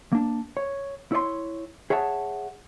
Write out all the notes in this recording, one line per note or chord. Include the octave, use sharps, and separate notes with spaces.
A#3 D4
C#5
E4 C#5 D5 C6
G#4 C#5 E5 F#5 G#5 A5